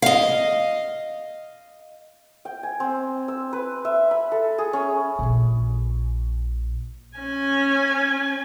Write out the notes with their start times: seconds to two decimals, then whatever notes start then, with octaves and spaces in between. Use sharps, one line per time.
0.02 D#5 F5
2.45 G5
2.63 G#5
2.80 C4
3.28 E6
3.53 B4
3.85 E5
4.11 B5
4.32 A4
4.58 G#4
4.73 C#4
5.19 A#1 A#2
7.18 C#4 G#5